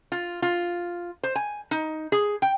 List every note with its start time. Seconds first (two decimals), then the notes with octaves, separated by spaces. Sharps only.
0.12 F4
0.42 F4
1.23 C5
1.35 G#5
1.71 D#4
2.12 G#4
2.42 G5